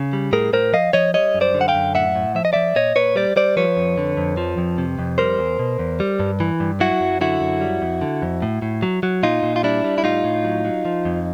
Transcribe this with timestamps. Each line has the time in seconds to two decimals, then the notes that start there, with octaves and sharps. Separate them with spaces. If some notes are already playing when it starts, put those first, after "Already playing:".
Already playing: C#3
0.13 G3
0.33 A2 G#4 A#4
0.53 A2 A#4 C5
0.73 F3 D#5 F5
0.93 F3 C#5 D#5
1.14 G3 C#5 D#5
1.35 F#2
1.41 C5 D5
1.54 D3
1.61 F#5
1.68 F5 G5
1.75 F#2
1.95 A2 E5 F#5
2.15 A2
2.35 F3 E5
2.45 D#5
2.53 F3 D5 E5
2.76 A#2 C#5 D#5
2.96 A#2 B4 C#5
3.16 G3 C5 D5
3.36 G3 C5 D5
3.57 F3 B4 C#5
3.77 F2
3.98 D3
4.17 F2
4.37 F3
4.58 F2
4.78 C3
4.99 F2
5.18 G3 A#4 C5
5.39 E2
5.59 B2
5.79 E2
6.00 G3
6.20 G2
6.40 E3
6.60 G2
6.80 F#3 E4 F#4
7.01 F#2
7.21 D3 E4 F#4
7.41 F#2
7.61 G3
7.82 F2
8.01 D3
8.22 F2
8.42 A2
8.62 A2
8.83 F#3
9.03 F#3
9.23 A#2 D#4 F4
9.43 A#2
9.56 F4
9.63 G3 D4 E4
9.84 G3
9.98 E4
10.04 A2 D#4 F4
10.24 A2
10.45 F#3
10.65 F#3
10.85 F3
11.05 F2